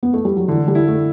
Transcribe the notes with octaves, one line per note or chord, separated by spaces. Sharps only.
B3
A3
G3
F#3
D3 E3
G3
E4
A3